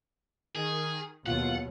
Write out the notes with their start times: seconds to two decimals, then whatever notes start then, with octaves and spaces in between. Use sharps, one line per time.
0.55 D#3 G#4
1.26 D#2 B2 F#3 F4 F#5